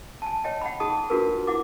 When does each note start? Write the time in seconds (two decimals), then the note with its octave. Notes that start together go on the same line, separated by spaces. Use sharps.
0.22 G#5 A5
0.44 C#5 D#5 G5
0.62 F#5 G5 B5
0.80 D#4 G#4 A5 D#6
1.10 D4 F4 F#4 G#4 A#4 B4
1.47 E4 F#5 D6